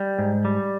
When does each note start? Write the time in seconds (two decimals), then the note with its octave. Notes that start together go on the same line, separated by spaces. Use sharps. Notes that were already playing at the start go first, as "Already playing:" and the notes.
Already playing: G3
0.19 G#2
0.45 G3